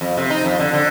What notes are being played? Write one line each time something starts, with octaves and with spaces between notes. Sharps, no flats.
F2
C3
D#4
F2
D3
D3